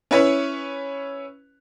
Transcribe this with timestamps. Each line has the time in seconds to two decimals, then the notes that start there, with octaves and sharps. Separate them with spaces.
0.11 C#4 E4 B4 C#5